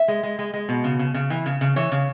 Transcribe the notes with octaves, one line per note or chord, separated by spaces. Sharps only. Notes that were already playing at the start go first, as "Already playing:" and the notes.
Already playing: E5
G#3
G#3
G#3
G#3
B2
C#3
C#3
C#3
E3
C#3
C#3
E3 C#5
C#3